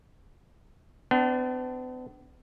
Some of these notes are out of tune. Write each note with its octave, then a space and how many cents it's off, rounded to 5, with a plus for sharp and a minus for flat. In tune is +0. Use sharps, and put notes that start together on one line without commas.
B3 +45 D4 +0